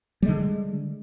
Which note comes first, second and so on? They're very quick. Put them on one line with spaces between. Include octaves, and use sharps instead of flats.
G3 G#3 D3